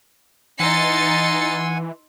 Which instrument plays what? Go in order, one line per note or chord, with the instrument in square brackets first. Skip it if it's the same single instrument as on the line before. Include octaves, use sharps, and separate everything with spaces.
[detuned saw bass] E3 [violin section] D#4 A6 C#7 [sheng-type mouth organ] F#5 G#5 [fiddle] C6 E6